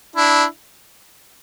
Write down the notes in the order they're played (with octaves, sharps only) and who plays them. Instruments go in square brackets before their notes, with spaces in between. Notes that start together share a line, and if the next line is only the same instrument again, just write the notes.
[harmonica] D4 E4